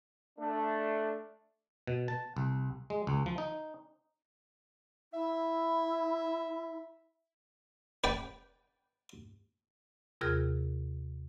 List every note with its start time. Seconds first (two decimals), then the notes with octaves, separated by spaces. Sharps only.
0.39 A3 D4
1.87 B2
2.08 A5
2.37 C2
2.90 G#3
3.07 C#2
3.26 F3
3.38 D#4
5.13 E4 E5
8.04 B4 D5 G5
10.21 D#2 C3 F4 G#4 A#4 F6